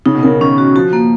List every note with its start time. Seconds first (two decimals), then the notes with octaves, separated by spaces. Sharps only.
0.06 C#3 D#4
0.15 B2
0.23 C#3 A#4
0.41 D#3 C#4
0.58 F#4
0.76 F3 F#4
0.93 A#3